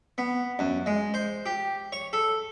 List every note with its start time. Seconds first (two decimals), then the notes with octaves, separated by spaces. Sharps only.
0.18 B3
0.59 F#2
0.86 G#3
1.14 C5
1.46 G4
1.92 C#5
2.13 A4